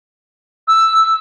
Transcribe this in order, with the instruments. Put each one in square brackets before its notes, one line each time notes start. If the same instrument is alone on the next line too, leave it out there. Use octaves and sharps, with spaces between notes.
[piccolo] E6